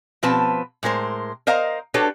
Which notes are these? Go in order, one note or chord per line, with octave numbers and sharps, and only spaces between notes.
B2 F3 C4 B4 A5
A2 G#3 A#4 C5
A#4 C5 D#5 F5 A#5
D4 F#4 G4 A4 B4 C#5